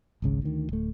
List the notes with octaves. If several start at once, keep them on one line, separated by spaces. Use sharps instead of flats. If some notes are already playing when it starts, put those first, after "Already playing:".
G#1 C#2 C#3
D2 D#3
D1 A3